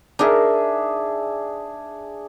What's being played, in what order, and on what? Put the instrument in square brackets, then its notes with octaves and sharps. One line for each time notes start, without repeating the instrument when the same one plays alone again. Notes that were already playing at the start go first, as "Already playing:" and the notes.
[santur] D4 G#4 E5 [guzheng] D#4 A#4